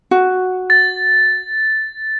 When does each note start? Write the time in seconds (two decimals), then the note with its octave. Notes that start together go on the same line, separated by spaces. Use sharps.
0.11 F#4
0.70 A6